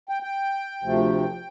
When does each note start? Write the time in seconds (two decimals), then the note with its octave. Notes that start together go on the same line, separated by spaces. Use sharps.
0.09 G5
0.23 G5
0.83 D2 C3 F3 A3